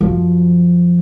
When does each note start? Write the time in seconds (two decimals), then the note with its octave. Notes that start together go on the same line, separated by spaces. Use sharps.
0.01 F#2 F3